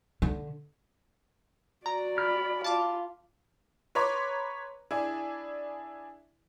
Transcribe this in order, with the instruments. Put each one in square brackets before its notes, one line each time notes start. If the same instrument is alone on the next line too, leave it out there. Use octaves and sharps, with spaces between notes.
[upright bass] D3
[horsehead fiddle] F#4 D5 [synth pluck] A#5
[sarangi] B5 [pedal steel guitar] F6
[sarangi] F4 [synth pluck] A5 D6
[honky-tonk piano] B4 C#5 A#5 C6 D6
D4 E4 G#4